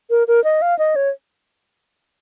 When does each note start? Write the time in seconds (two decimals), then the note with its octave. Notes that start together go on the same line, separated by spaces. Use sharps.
0.10 A#4
0.28 A#4
0.44 D#5
0.62 F5
0.79 D#5
0.96 C#5